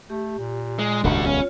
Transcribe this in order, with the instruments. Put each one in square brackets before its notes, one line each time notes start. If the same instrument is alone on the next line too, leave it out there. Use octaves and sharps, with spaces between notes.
[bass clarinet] A3 [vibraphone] G4
[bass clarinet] A#2
[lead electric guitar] G#3 [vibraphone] D#5
[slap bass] D#1 C#2 [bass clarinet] G2 [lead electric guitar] D4 F#4
[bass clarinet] B3 [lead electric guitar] C#4 [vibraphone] F4 C#5